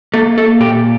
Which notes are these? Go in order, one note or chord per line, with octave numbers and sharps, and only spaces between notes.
A#3 A4
A4
A#2 G4